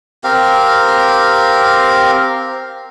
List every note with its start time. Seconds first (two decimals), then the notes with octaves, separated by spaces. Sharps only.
0.24 C4 G4 A#4 F5